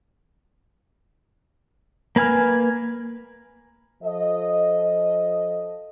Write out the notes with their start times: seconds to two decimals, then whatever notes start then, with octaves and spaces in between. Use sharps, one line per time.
2.16 A#3 B4 G#5 F6
4.03 F3 A4 D#5